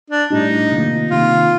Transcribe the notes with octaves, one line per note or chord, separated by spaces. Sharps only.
D4
A2 G3 D4 D#4
C3 D#3 A#3 F4
C3 D#3 A#3 F4